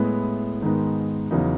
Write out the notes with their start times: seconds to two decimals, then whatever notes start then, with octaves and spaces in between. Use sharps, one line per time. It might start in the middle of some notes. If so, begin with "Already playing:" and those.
Already playing: A2 G#3 B3 E4
0.62 G#2 D#3 G#3 B3 D#4
1.31 E2 C#3 F#3 B3 D#4